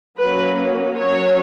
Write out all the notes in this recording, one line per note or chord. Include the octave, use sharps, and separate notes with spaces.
F#3 A#3 C#4 B4
F#3 C#4 C#5